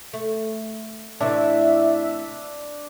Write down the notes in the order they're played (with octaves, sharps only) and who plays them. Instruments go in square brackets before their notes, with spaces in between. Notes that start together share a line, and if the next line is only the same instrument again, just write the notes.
[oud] A3
[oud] A2 C3 E3 [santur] D4 [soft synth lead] E5